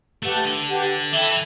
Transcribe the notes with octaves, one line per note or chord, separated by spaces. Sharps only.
A3 G4 B4 F#5 A5
D3
G4 B4 F#5 A5
E3 A4 E5 G5 B5